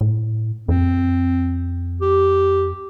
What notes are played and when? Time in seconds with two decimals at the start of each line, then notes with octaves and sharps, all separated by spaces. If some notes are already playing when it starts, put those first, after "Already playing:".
0.01 A2
0.68 F2 C4
2.01 G4